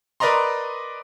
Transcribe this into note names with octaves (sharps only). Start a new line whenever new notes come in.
A#4 B4 D5 D#5 A#5 C6